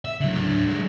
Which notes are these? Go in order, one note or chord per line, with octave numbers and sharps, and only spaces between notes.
E5
D3 F#3
F#3 D4
F#3 G#3